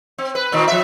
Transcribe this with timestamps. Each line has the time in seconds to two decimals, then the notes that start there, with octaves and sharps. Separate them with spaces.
0.18 C4
0.35 B4
0.52 A#2 D#3 C4
0.67 F3 E5